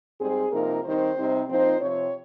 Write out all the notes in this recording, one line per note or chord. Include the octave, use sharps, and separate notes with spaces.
G#2 G3 C4 G#4
C3 F3 A#3 D#4 A#4
D#3 G3 C4 D#4 C5
C3 G3 C4 D#4
A#2 F3 C4 D#4 C5
C3 F3 C4 C#5